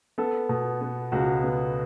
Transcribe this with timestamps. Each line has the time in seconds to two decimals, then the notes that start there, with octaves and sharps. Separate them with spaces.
0.18 B3 A4
0.49 B2
0.81 B3
1.12 C#2 F#4
1.43 B3